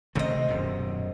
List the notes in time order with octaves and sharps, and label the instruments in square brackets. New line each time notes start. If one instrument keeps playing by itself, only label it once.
[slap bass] C3 D#3 A3 [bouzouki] C4 D#5
[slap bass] D#1 F#2 B2